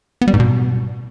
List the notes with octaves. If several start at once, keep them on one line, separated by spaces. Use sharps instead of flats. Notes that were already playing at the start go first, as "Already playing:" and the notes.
B3
G3
G#2
B2